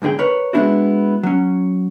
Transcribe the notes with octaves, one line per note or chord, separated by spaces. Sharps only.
B1 G#2 D3 G#4 G5
A#4 B4 C#5
G#3 A3 B3 D4 E4 F#4
F#3 C#4